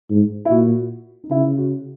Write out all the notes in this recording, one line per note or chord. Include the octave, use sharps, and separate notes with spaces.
G#2
E4
A#2 F#4
D#4
C#3 E4
F#4